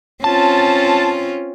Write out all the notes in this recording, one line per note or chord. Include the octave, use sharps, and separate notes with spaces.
C4 C#4 F4 A5